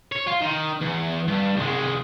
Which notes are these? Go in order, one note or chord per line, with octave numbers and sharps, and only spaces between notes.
C#5
F4
D#3
E2
G2
C2 G#3